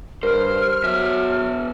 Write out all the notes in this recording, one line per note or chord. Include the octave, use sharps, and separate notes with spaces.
G2 A#4 C5 F6
B2 F#3 E5